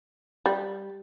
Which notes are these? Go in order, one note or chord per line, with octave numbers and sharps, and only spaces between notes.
G3